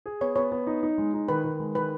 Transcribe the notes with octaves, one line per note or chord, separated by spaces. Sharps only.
G#4
B3 C#5
B3 C#5
B3
D#4
D#4
G#3
D#4
D#3 B4
D#3
G#3
D#3 B4